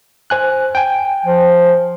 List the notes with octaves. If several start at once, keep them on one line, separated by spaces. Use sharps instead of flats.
C5 G#5 F#6
G5 G#5
F3